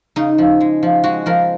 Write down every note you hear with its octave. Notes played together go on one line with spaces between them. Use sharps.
C#3 D#4
F3
G#3
F3
G#3 F#4
F3 A#4